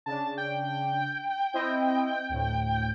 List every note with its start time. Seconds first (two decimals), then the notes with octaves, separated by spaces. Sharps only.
0.06 C#3 D4 A5
0.38 G5
1.53 C4 E4 D#5
2.29 D2 A2